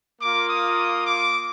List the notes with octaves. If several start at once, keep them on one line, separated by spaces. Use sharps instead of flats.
A#3 F4 D6
D#6
D6